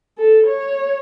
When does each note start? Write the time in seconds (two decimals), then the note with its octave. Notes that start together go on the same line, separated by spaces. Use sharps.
0.18 A4
0.47 C#5